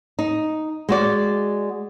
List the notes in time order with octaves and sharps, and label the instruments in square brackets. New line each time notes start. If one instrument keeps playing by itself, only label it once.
[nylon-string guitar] D#4
G#3 F#4 D5